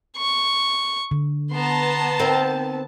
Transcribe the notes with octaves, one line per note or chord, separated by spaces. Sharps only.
C#6
D3
B3 A5 A#5 C6
C4 D#4 A#4